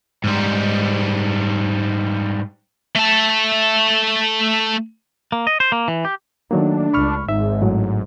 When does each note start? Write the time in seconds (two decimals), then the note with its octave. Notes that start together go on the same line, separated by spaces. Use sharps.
0.24 G#2 G3
2.96 A3 A5
5.32 A#3
5.47 D#5
5.60 C5
5.72 A#3
5.88 E3
6.05 G4
6.51 D#3 F#3 A3 A#3 D4
6.93 C#2 B5 C#6 F6
7.29 G#1 G#2 E5
7.62 A2 F#3